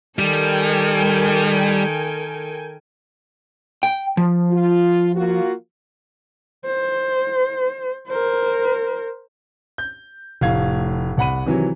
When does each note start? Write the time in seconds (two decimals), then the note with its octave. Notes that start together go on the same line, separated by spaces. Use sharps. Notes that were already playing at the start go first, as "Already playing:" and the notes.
0.19 D#3 G3 A4 A#4 G5 G#5
3.83 G5
4.17 F3
4.51 F4
5.15 A#3 F4 F#4
6.66 C5
8.08 A#4 C5
9.78 G6
10.41 F1 A2 F5 G#6
11.17 C2 F#5 B5 D#7
11.46 C3 D#3 E3 F#3